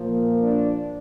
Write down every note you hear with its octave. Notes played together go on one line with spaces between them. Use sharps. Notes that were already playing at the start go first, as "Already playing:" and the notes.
Already playing: A#2 F3 A#3
D4